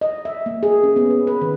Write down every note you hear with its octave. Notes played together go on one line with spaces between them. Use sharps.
D#5
E5
A#3
G#4
C#4
B3
B4
B4
D#3